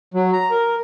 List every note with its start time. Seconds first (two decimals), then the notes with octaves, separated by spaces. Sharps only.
0.14 F#3
0.32 A#5
0.51 A#4